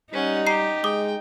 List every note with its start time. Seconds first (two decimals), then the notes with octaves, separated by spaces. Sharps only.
0.13 G3 C#4 D#4 F#5
0.47 G4 A#5 C7
0.84 G#3 G5 D6 D#6